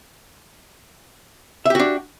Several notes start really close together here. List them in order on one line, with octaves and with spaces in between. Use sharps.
E5 G4 F#4 D4